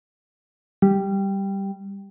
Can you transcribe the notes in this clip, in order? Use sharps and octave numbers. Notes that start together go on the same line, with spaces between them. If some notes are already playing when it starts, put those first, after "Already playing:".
G3